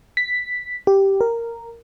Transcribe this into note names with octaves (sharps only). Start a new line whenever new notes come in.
B6
G4
A#4